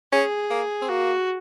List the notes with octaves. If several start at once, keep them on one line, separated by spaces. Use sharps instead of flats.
C#4 G#4
A#3
C4
A#3 F#4